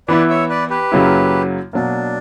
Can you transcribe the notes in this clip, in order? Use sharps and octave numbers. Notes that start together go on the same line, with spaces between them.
E3 B3 E4 B4 D5
C#5 E5
B4 D5
G4 B4
F#2 C#3 F#3 A#3 E4
B2 F#3 A#3 D4